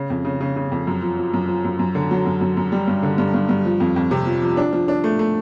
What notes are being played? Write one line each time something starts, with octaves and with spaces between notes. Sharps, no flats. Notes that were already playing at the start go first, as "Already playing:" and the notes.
Already playing: C#3
F2
C#3
C#3
C#3
F2
F#2
F3
F3
F#2
F3
F#2
F#2
D3
F#3
F#2
F#2
F#2
G3
G2
D3
G2
G2
G2
F3
F2
F2
C3
F3
F3
D4
F3
D4
A3
A3